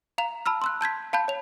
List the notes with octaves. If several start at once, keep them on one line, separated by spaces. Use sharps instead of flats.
F5 A#5 F7
A5 B5 E6 F6
C6 E6 F#6
A5 G6 G#6 B6
F5 A5 B5 G6
C#5 F7